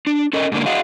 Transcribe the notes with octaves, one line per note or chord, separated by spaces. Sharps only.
D4
C#4 A4 A#4 D#5
G#2 D3 A#3
F#4 G#4 D#5 F5 F#5